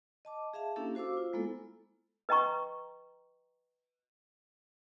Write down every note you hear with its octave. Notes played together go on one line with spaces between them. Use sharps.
D#5 A5 D6
G#4 E5 F5 A5
A#3 C#4 D4 E4 G4 A4
F#4 C5 F5 D6 E6
F4 C5
G#3 A#3 B3 E4 A4
B4 D#5 G5 A#5 C#6